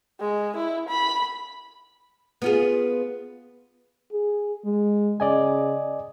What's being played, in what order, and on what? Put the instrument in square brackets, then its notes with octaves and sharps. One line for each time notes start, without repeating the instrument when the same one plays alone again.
[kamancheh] G#3
E4
B5
[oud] B3 F4 G#4
[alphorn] G#4
G#3
[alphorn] C#3 [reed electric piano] D5 D#5 G#5